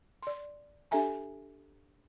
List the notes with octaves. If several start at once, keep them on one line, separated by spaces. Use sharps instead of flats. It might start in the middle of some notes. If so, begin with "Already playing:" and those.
D5 C6
D4 G4 A4 E5 G#5 A#5